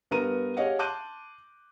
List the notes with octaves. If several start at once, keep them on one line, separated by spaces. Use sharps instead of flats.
G2 B3 A#4 A#5 D#7
G4 G#4 C#5 D#5 F5 F#5
A5 C6 D6 F#6 G6 D#7